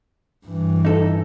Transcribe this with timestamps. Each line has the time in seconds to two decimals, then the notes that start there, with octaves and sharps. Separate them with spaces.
0.47 G2 E3
0.85 D#4 A4